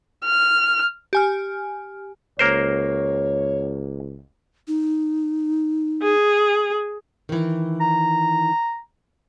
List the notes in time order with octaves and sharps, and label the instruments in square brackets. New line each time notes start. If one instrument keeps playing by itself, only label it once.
[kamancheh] F6
[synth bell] G4 G#5 F6
[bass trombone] C#2 [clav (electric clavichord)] A#3 A#4 C5 [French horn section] C#5
[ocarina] D#4
[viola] G#4
[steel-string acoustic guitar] D#3 E3
[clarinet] A#5